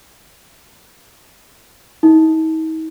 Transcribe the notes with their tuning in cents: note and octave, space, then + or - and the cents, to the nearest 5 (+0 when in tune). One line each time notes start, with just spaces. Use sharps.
D#4 +45